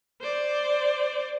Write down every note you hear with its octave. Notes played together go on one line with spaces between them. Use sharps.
C5 D5